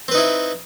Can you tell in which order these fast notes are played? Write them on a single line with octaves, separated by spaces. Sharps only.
C4 B4 D#4 E4